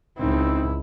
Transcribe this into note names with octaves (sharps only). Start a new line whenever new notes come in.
C#2 C4 D#4 E4